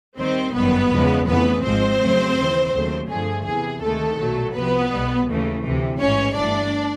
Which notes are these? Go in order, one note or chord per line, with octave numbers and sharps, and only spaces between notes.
D#2 D#3 G3 C4 C5
G1 F#2 D#3 G3 B3 B4
E2 C#3 F3 G#3
F2 C#3 E3 A3 B3 B4
G#1 G#2 F3 G#3 C4 C5
F2 C#3 F#3 A3
D#2 C#3 E3
D#2 C#3 F#3 A3
G2 D3 F3 A3 G#4
E2 C3 E3 G#4
D2 C3 D#3 G#3 A3 A4
B1 A#2 F#3 A3
C2 C3 F3 B3 B4
B1 B2 G3
D#2 C#3 E3 A3
D2 C3 E3
A1 G#2 E3 C#4 C#5
G1 G2 E3 A3 D4 D5